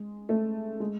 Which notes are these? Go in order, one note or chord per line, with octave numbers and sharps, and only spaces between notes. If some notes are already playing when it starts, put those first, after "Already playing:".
Already playing: G#3
A3
G#3